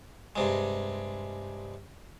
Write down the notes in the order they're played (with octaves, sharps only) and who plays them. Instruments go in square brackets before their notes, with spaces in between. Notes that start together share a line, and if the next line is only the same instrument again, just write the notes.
[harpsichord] G2 C3 G#3